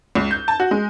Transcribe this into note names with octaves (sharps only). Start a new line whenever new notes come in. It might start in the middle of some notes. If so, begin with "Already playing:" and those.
C#2
G6
A5
F#4
G#3